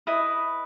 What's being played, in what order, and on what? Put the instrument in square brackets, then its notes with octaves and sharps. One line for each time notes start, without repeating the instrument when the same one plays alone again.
[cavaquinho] E4 B4 D#5 D#6